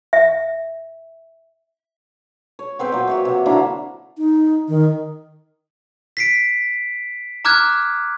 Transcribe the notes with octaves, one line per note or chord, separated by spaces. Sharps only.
E5
C#5
B3 C4 B4 G5
A#2 F#3
F#4 C#5 E5
C3
D3 F#3 A#3 E4
D#4
D#3
B6 C7 D7
A#5 D6 F6 F#6 G#6